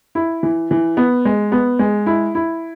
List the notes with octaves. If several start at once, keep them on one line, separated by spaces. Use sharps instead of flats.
E4
E3
E3
B3
G#3
B3
G#3
E4
E4